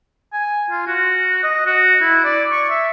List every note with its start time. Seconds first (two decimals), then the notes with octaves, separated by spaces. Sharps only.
0.33 G#5
0.71 F4
0.87 F#4
1.44 D#5
1.66 F#4
2.02 E4
2.24 D5
2.51 C#6
2.70 E5